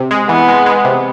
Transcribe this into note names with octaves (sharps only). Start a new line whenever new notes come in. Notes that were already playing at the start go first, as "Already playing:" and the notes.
Already playing: C3
G#3
E3 B3
G#3
G#3
C3